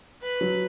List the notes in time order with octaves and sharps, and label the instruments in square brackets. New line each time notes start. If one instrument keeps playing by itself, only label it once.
[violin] B4
[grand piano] F#3